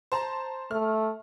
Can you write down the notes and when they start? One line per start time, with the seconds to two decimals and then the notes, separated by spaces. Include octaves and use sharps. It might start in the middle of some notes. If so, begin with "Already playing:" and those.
0.12 C5 A5 A#5
0.71 A3 F6